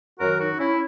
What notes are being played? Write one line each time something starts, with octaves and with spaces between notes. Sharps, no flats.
F#2 D#3 F#3 F#4 A#4
D#4 F#4
C#4 E4